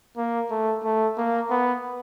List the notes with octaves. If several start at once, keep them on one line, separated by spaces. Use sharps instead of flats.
A#3
A3
A3
A#3
B3